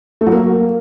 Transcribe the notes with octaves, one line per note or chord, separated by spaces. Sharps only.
A3
F#3
A#3